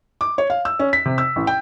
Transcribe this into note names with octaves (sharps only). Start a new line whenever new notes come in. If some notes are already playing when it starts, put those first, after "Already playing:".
D6
C#5
F5
E6
C#4
B6
C3
E6
A1
G5